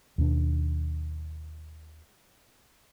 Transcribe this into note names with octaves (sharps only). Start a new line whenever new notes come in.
D#2 B2 C#4 D4